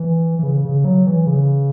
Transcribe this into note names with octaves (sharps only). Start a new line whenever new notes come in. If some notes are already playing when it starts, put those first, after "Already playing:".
Already playing: E3
E3
C#3
C#3
F#3
E3
C#3